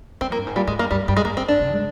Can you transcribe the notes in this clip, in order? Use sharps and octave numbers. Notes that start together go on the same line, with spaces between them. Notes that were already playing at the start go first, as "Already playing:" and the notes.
G#3 C4
F3 A#3
G2
G#2
A#2 G3
G#2 G#3
G2 A#3
G2 G3
G2 G3
G#3
G2 A#3
C4
D4
C3
G#3